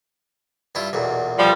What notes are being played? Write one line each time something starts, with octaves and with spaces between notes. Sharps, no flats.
G2 E4 F4
B1 E2 A#2
F3 G3